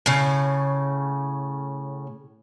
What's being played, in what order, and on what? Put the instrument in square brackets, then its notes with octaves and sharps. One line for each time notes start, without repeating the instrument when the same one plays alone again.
[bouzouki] A2 C#3